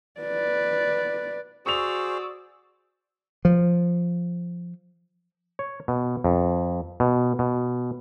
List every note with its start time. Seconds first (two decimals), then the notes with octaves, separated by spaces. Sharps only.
0.20 B4 D5
1.66 F#4 G#4 C5 D5 C#6 E6 F7
3.45 F3
5.59 C#5
5.88 B2
6.24 F2
7.00 B2
7.39 B2